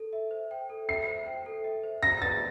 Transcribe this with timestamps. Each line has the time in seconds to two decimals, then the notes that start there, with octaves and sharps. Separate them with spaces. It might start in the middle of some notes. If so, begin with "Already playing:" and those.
Already playing: A4
0.13 E5
0.31 C5
0.51 G5
0.69 A4
0.89 E5 C7
1.07 C5
1.26 G5
1.46 A4
1.64 E5
1.84 C5
2.03 A#5 A#6
2.21 B4 A6